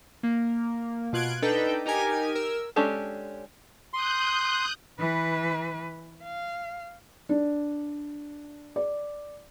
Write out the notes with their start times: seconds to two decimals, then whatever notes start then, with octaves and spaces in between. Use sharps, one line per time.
0.23 A#3
1.13 B2 F4 F#6 G#6 D7
1.42 D4 D#4 A4 B4 G5
1.86 D#4 G4 A#4 G#5
2.35 A#4 E6
2.76 G#3 C#4 D4 G4 A4
3.93 C6 D#6 F#6 G6
4.99 E3 B4
6.23 F5
7.29 D4
8.76 D5